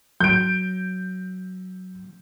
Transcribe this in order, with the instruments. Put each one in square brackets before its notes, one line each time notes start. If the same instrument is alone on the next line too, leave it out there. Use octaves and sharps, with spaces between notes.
[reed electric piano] F#3 [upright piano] G6 D7